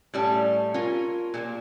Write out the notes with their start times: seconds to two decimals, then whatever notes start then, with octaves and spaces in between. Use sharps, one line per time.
0.14 A2 G3 C#4
0.74 C#4 F4 A#4
1.34 A#2 G3 A#3